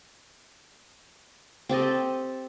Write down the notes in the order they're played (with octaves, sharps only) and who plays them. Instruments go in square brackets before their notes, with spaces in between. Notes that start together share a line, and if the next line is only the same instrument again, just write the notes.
[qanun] C4 G4 A4 D#5